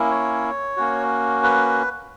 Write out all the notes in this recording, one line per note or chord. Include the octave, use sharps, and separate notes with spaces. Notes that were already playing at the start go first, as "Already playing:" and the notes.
Already playing: A#3 C#4 E4
C#5
A#3 C#4 F#4
B4